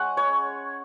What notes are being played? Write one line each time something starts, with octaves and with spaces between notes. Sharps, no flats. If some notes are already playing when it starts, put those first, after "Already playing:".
Already playing: G#3 C#4 F#5
C#5